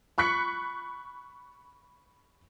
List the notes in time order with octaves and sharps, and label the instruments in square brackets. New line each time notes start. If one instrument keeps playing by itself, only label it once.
[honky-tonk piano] B5 C#6 F#6 B6 C#7